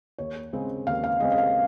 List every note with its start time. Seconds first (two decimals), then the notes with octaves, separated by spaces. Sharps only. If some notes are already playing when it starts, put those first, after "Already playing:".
0.18 D#2 C#5
0.53 C#3 G#3 C4
0.87 D#2 F5
1.04 F5
1.20 C#3 G#3 C4 D#5
1.32 D#5
1.38 F5